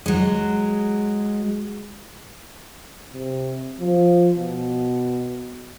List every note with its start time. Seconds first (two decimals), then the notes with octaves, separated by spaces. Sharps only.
0.06 F#3 G#3
3.13 C3
3.80 F3
4.36 B2